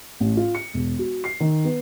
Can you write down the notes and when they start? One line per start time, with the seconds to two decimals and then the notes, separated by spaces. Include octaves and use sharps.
0.20 A1
0.37 F4
0.55 C#7
0.74 E1
0.99 F#4
1.24 C7
1.40 D#3
1.65 B3